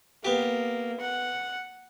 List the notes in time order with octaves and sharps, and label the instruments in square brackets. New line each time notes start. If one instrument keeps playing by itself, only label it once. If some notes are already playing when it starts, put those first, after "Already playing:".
[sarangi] A#3 [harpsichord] B3 G4
[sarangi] F#5